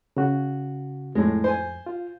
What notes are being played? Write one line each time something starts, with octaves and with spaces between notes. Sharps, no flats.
C#3 F#4
F2 A2 G#3
C5 G#5
F4